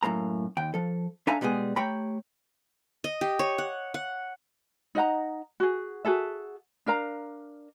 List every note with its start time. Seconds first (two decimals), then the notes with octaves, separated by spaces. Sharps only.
0.03 F#2 A2 A#3 A#5
0.57 D#2 G5
0.74 F3 A4
1.27 D4 A4 E5 F5 G#5 A#5
1.41 B2 G3 G#3 B3 G#4
1.76 A3 G4 C#5 G5 A#5 B5
3.04 D#5
3.21 G4
3.39 C#5
3.58 F#5
3.94 F#5
4.95 D#4 D#5 F#5 A#5
5.60 F#4 G#4
6.05 F#4 G#4 A4 E5
6.86 D4 A#4 F5 A#5